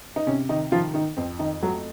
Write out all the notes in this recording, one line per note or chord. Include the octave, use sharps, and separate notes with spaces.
D#4
C3 C#4
D#3 D#4
D#3 F3 F4
D#3 D#4
F2 C4
D#3 D#4
F#3 A3 F#4